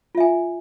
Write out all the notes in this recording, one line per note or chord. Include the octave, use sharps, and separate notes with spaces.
F4 E5 G#5